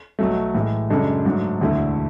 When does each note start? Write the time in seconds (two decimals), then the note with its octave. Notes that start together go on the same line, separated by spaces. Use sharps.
0.19 B1 B2 F#3 A3
0.55 A2 E3 G#3
0.90 F#2 C#3 G#3 D4 A4
1.25 G#2 F#3 A3 D4
1.60 E1 D2 D3 A3 E4